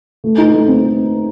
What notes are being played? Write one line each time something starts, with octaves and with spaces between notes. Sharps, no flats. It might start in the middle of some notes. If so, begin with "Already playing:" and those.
A3
D#4
A3
C4